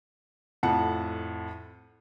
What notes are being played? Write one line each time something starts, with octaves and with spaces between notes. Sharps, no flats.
F2 A2 F#5 A5